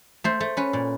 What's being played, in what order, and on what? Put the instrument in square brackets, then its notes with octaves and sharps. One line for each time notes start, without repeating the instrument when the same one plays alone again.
[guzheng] A3 C5
A3
C#4 B4
A#2